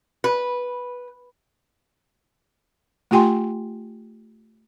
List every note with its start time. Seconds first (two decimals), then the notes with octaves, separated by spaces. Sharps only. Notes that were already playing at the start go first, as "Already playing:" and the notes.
0.24 B4
3.11 A3 F4 G4 G5 G#5 C6